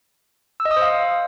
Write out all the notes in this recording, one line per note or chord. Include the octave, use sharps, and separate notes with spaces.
E6
D#5
D#6
C5
F5